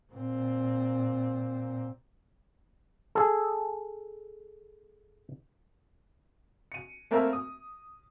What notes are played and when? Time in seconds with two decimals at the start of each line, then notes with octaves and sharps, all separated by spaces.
0.13 A#2 C4
3.15 G#4 A4
6.72 C#7 D#7
7.11 A3 A#3 C4 A#4 E5
7.33 D#6